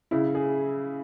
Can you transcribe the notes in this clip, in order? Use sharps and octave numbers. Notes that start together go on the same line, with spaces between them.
C#3 E4
G#4